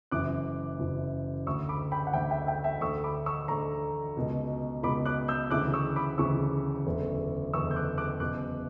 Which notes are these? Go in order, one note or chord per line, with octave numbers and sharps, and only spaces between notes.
F#1 F#2 E3 D6 F#6
F#1 F#2 E3
D2 D3 C#6 E6
B5 D6
G5 B5
F#5
D2 D3 E5 G5
E5 G5
E5 G5
E5 G5
D2 D3 C#6 E6
B5 D6
C#6 E6
D2 D3 A#5 C#6
C#2 B2
C#2 B2 B5 D6
D6 F#6
E6 G6
D2 C#3 E3 D6 F#6
C#6 E6
B5 D6
D2 C#3 E3 C#6 E6
F#1 E2 D3
F#1 E2 D3 C#6 E6
G6
D6 F#6
D6 F#6
F#1 E2 B2 D6 F#6